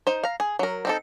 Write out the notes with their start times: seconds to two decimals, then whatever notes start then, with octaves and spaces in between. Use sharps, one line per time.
0.07 D#4 C5
0.23 F5 A#5
0.40 G#4
0.59 F#3 A#4
0.85 C4 D#4 A4